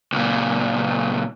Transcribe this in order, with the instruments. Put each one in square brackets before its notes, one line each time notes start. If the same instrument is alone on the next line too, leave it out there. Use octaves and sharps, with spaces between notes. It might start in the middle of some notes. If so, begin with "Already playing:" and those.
[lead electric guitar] C#2 A#2